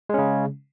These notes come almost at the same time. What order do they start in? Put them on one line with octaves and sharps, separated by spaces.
G#3 C#4 C#3